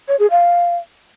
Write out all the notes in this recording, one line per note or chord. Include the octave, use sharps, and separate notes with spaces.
C#5
G#4
F5